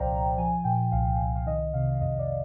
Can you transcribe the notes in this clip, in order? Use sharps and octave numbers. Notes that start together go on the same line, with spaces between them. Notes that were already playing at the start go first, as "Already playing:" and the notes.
Already playing: C2 A#2 F3 C5 D5 F5 G5 A#5
C2
F3 G#5
A#2 G5
C2 F5
C2
F5
D#3 D#5
C3 F5
F2 D#5
D5